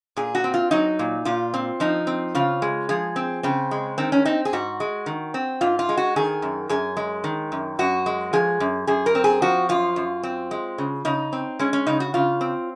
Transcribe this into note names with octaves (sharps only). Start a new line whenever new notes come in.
A#2 G#4
F#4
C4
F4
F#3 D#4
A#2
A#2 F4
C4
F3 D#4
C4
C#3 F4
G#3
F3 G#4
C4
C#3 C4
G#3
D#3 C4
C#4
C4 D#4
G#4
G#2 F#4
G#3
D#3
C4
G#2 F4
F4
G#3
F#4
D#3 G#4
F#2
F#2 G#4
G#3
D#3
F#2
F#2 F#4
G#3
F3 G#4
F#2
F#2 G#4
A#4
C4
G#4
F3 F#4
F#2 F4
F#2
C4
G#3
C#3
C#3 D#4
C4
G#3 C#4
C#4
C#3 D#4
F#4
C#3 F4
C4